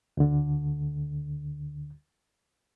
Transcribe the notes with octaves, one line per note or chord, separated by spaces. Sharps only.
D2 D3